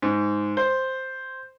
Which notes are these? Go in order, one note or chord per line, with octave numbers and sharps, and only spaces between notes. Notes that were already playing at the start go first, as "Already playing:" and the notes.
G#2
C5